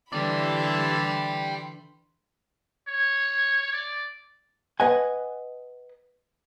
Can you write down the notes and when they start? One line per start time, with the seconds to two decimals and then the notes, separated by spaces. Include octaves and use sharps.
0.13 D3 E3 E4 G4 D5 A5 B5 C6
2.87 C#5
3.72 D5
4.80 B4 D#5 F#5 G#5